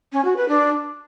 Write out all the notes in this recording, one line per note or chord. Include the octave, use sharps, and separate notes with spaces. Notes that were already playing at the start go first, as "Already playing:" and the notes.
C#4
F#4
B4
D4